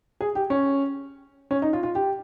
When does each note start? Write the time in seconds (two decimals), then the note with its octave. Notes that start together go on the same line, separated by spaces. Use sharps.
0.21 G#4
0.35 G4
0.50 C#4
1.51 C#4
1.62 D#4
1.73 F4
1.83 F4
1.95 G4